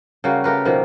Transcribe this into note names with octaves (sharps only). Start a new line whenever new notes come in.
C#3 G3 A#3 F#4
A3 G4 A#4 B4
B2 D#3 F3 A#3